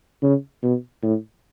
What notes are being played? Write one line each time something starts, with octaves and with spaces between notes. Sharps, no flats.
C#3
B2
A2